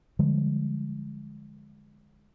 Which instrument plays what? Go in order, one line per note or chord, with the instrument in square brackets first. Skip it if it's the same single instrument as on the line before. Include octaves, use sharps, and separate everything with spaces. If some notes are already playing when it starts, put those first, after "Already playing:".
[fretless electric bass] D3 F3 G3 G#3